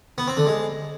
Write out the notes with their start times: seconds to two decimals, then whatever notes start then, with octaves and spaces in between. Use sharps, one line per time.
0.18 B3
0.28 C4
0.37 D3
0.47 G#3